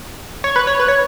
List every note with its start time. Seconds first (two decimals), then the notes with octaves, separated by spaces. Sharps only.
0.44 C#5
0.56 B4
0.67 C#5
0.79 B4
0.88 C#5